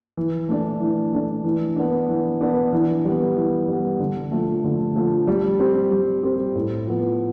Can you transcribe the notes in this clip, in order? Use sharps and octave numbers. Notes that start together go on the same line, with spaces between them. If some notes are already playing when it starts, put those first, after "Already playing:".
E3
A3 D4
E3
A3 D4
E3
B3 D4
E3
B3 D4
E3
G3 B3
E3
G3 B3
D3
F3 A3
D3
F3 A3
G3
C4 G4
G3
C4 G4
A2
F3 B3